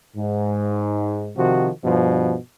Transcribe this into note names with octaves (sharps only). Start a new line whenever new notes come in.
G#2
C3 D#3 F3 F#4
G2 B2 F3